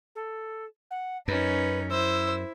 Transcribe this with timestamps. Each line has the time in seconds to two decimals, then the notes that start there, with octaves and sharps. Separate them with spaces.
0.15 A4
0.91 F#5
1.28 F#2 C#4 D#4 B4
1.90 E4 C5 E6